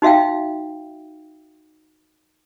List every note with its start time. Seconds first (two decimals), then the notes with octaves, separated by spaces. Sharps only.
0.02 D#4 F#4 E5 F5 G5